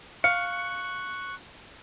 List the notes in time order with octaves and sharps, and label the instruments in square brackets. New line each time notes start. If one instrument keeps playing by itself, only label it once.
[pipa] F5 [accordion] C#6 F#6 [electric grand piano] C#7